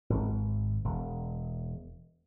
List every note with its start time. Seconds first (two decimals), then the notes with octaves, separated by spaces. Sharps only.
0.10 G#1
0.85 E1